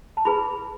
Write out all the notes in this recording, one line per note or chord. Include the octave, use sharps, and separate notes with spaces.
A5
E4 G#4 B4 B5